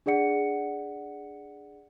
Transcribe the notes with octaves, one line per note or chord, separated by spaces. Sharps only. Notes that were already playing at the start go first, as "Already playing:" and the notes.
D4 G#4 D5 F#5 C#7